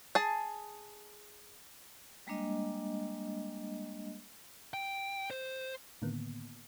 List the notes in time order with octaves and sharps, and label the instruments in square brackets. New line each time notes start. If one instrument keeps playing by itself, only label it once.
[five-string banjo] G#4 A5
[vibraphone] G3 G#3 A#3 D4 D#5
[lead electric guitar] G5
C5
[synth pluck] A2 D3 D#3 A#3 B3